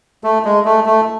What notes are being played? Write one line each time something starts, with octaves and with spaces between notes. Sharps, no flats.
A3
G#3
A3
A3